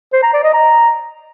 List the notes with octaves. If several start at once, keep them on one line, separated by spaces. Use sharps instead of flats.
C5
A#5
D5
D#5
A#5